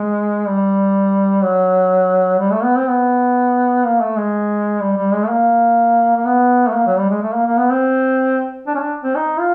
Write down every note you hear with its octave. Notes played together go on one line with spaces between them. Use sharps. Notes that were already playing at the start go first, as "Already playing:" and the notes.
Already playing: G#3
G3
F#3
G3
A3
B3
C4
B3
A#3
A3
G#3
G3
G3
G#3
A3
A#3
A#3
B3
A3
A#3
F#3
G3
G#3
A3
A#3
A#3
B3
C4
D4
C#4
D4
C4
D#4
F4